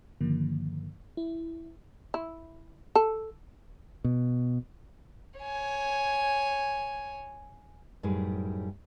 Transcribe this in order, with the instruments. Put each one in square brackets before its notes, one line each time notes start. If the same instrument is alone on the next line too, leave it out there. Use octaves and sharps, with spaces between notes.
[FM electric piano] G2 D3 D#3 F3 A#3
E4
[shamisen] E4
A4
[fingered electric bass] B2
[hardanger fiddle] C#5 G#5
[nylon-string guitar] F#2 A2 G3 D#4 G#4 B4